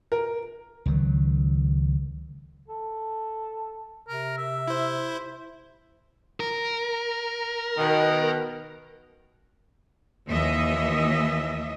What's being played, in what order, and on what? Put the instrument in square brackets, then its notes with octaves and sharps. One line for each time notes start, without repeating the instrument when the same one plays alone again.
[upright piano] A#4
[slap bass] C#2 D#3 F#3
[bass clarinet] A4
[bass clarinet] C3 [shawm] A#4
[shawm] E5
[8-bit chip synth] E4 C5
[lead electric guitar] A#4
[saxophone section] B2 D#3
[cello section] D#2 E3 D#5 E5